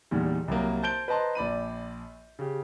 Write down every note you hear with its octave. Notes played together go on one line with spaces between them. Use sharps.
E2 A#2 D#3 G3
C2 F#3 A#3
C5 A5 G6 D7 G7
B4 C5 D#5 A5 A#5 C6
A#1 D5 B5 D#7
C#3 G4